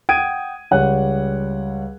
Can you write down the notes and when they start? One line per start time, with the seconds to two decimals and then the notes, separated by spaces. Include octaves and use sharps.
0.09 F#5 G5 D#6 G#6 D7 D#7
0.71 C#2 G3 C#5 F#5 F#6